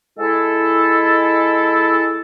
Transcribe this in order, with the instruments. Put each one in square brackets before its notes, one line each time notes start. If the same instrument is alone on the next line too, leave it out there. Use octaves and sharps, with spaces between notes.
[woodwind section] G#3 E4 A4